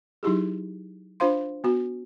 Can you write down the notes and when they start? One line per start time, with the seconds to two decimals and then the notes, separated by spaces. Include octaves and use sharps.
0.23 F#3 D#4 E4 G4 G#4
1.20 D4 F4 C5 F5 C6
1.64 B3 F#4